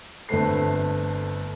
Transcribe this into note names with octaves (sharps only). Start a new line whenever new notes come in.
G1 D3 A3 C4 B4 C7